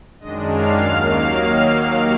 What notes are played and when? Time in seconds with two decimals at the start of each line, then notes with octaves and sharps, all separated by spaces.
0.20 F#2 D#3 G#3 D4 D#5 D#6
0.51 F5 F6
0.82 D#2 D#3 F#3 A#3 F5 F6